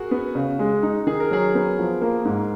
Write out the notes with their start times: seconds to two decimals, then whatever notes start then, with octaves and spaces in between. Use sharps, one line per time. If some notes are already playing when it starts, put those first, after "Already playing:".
Already playing: F#4 G#4 A#4
0.11 B3
0.35 C#3
0.59 G#3
0.83 D#4
1.07 D#3 G#4
1.20 A#4
1.31 F#3 G#4
1.55 B3
1.79 F3
2.01 A#3
2.25 G#2